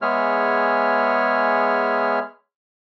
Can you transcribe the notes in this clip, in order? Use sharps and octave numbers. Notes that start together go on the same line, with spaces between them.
G#3 B3 G#4 C#5 E5 F6